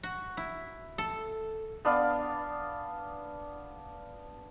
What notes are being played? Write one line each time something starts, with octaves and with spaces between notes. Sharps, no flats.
F#4
E4
A4
B3 D4 F5